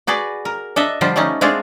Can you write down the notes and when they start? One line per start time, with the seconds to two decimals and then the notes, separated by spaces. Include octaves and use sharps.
0.07 F#4 G#4 B4 D5
0.45 A#4
0.76 D4 A4 D#5 E5
1.01 D3 F3 G3 F4 C5
1.16 G3 A3 C#4 D#4
1.41 G#3 A3 C4 D4 F4 G#4